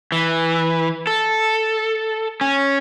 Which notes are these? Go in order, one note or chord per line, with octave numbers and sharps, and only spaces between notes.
E3
A4
C#4